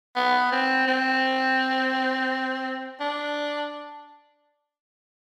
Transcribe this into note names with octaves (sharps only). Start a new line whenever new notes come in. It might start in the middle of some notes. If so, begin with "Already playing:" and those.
B3
C4
C4
D4